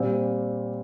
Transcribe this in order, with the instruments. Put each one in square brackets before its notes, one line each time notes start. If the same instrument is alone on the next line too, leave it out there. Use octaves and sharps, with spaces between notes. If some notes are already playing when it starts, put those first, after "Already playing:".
Already playing: [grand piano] A#2 G3 C4